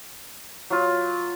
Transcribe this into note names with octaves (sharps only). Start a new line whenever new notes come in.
F#3 F4